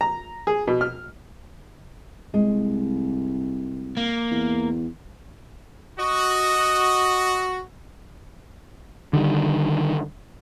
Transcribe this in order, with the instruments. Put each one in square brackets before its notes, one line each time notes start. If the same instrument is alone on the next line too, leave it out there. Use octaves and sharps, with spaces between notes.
[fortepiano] A#5
G#4
B2
F6
[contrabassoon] C2 [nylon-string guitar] G#3
[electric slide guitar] A#3
[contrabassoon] E2
[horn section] F#4 [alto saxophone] D#5
[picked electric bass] D3 D#3 G3